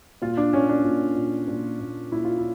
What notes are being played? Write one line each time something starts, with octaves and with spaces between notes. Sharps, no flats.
A#2 F4
D4
A#2 C#4
D4
A#2
A#2
A#2
A#2
A#2 E4
F4
E4